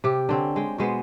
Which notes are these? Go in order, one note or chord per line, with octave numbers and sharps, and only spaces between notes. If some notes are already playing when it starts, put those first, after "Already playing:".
C3 G4
D3 C4 C#4
G#3 G5
B2 G#3 B3 C5